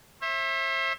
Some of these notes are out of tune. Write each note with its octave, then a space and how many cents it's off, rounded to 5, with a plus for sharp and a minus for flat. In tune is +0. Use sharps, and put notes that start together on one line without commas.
C5 +45 E5 +0